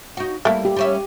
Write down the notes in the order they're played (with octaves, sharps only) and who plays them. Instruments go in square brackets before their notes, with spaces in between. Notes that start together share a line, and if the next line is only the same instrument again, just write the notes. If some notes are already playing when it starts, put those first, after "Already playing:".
[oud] D#4 F#4
[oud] G3 E4 [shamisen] A3 A#3
[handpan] G4
[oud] G3 C#4 E5